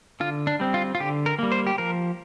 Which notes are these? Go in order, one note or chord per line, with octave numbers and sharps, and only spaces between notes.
D3 F4
D4
G3 C4
F4
F4
D3 G4
A#4
G3 A#3
C5
G4
F3 A#4